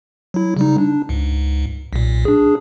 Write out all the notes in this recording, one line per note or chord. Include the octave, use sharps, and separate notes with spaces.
F#3 E4
C#3 G3 D#4
D4
C#2 G#2
B1 A#2
D4 G#4